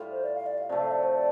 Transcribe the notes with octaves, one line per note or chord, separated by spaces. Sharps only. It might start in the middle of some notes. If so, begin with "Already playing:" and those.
Already playing: A2 G3 F4
C5
D5
F5
D5
F5
C3 F3 A3 D5
F5
D5
C5
D5